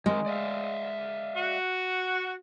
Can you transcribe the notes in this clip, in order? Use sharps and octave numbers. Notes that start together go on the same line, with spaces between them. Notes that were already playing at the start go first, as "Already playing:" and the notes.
D#3 G#3 C4 A#4
D5 E5 F5
F#4